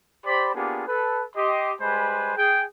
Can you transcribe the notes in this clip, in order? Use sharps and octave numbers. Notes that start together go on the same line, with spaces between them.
G4 C5 D5 B5
A#3 B3 D4 F4 G4 G#4
A4 B4
G4 D#5 C6
G3 G#3 B4 C5 G#5 B5
G#4 G5